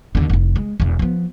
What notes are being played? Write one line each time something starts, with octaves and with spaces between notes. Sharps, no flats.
D#2 D3
F1 E4
G#3
E1 E2
F3 B3